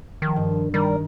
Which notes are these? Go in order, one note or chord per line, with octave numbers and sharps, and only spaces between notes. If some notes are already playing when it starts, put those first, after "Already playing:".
D#3 F3
G2
D#3 G3 A#4